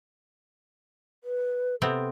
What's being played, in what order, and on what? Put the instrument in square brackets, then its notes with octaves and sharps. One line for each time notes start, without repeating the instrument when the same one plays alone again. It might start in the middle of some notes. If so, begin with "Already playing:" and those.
[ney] B4
[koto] C3 B3 C4 [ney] A4